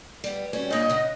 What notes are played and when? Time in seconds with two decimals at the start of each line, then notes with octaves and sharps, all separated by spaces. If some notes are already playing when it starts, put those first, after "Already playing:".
0.24 G3 B3
0.53 G3 C#4 F#4
0.70 G2 A#2 D#5
0.90 C#3 F#5